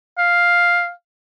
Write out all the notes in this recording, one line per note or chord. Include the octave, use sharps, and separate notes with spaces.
F5